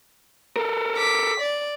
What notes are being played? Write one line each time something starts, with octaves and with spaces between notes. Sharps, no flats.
A4 A#4
D6 B6
D5